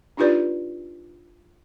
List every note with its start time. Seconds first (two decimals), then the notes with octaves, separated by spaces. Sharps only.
0.17 D4 D#4 F4 G4 B4 D5